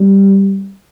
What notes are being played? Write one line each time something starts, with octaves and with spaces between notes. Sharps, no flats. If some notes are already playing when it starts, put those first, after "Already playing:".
Already playing: G3